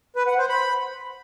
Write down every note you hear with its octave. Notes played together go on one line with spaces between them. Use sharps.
B4
F#5
C5
B5